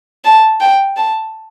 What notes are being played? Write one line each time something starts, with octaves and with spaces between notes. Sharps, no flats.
A5
G5
A5